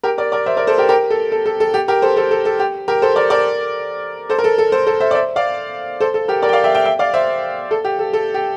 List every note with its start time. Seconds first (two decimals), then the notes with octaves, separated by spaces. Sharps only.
0.03 G4 A#4
0.18 A#4 D5
0.32 A#4 D5
0.46 C5 E5
0.57 A#4 D5
0.67 A4 C5
0.78 G4 A#4
0.89 G4 A#4
1.10 A4
1.32 A4
1.46 A4
1.60 A4
1.74 G4
1.88 G4 A#4
2.02 A4 C5
2.17 A4 C5
2.31 A4
2.45 A4
2.59 G4
2.88 G4 A#4
3.02 A4 C5
3.16 A#4 D5
3.30 A#4 D5
4.30 A4 C5
4.39 A#4
4.44 A4
4.58 A4
4.72 A4 C5
4.86 A4 C5
5.00 C5 E5
5.11 D5
5.15 C5 E5
5.36 D5 F5
6.01 A4 C5
6.14 A4
6.28 G4 A#4
6.42 A#4 D5
6.49 G5
6.53 D5 F5
6.64 E5 G5
6.75 E5 G5
6.85 E5 G5
6.99 D5 F5
7.14 C5 E5
7.71 A4
7.85 G4
7.99 A4
8.13 A4
8.34 G4